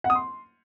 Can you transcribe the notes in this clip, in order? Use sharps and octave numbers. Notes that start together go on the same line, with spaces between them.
F#5
D#6
C6